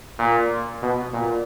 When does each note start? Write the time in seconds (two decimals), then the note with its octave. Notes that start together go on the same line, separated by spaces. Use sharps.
0.19 A#2
0.82 B2
1.13 A#2